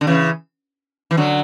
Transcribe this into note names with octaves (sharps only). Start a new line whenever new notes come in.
D3
C#3 E3
E3
D3 F#3